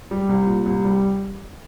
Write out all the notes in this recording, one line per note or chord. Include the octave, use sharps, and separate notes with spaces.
G3
C2
A#2
C2
G3